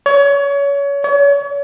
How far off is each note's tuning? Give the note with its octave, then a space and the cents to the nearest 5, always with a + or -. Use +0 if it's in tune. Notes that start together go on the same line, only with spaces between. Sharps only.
C#5 +25
C#5 +35